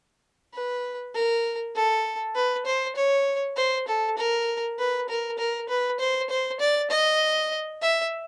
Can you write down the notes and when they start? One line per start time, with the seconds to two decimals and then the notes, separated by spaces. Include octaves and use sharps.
0.54 B4
1.15 A#4
1.75 A4
2.35 B4
2.66 C5
2.96 C#5
3.57 C5
3.88 A4
4.17 A#4
4.79 B4
5.09 A#4
5.38 A#4
5.69 B4
6.00 C5
6.30 C5
6.60 D5
6.90 D#5
7.82 E5